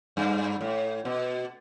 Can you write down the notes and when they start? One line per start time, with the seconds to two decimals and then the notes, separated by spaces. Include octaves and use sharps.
0.17 G2
0.61 A2
1.05 B2